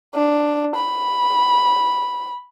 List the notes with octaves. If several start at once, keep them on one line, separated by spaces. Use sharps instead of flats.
D4
B5